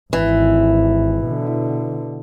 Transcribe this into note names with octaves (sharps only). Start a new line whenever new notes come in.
G#1 E3
B2 D3